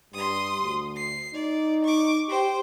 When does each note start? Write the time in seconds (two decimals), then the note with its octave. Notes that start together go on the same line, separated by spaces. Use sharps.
0.14 G2 C6 D#6
0.63 D2
0.97 C7
1.34 D#4 D5
1.85 C#6 D6
2.29 G4 C5 G5